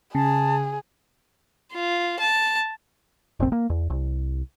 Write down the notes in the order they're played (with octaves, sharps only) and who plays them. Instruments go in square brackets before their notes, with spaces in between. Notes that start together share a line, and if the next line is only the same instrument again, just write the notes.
[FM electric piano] C#3 [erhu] G#4 [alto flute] A5
[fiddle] F4
A5
[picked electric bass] F1 A#1 C4
A#3
E2
C2